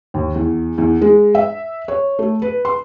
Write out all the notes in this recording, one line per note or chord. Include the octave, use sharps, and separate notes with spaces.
D#2
E2
E2
G#3
E5
C#5
A3
B4
C6